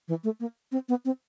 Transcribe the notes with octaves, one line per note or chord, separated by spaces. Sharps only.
E3
A3
A#3
C4
B3
C4